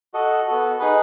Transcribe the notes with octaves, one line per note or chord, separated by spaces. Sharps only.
F#4 A4 D#5
B3 F#4 A4
D#4 G#4 B4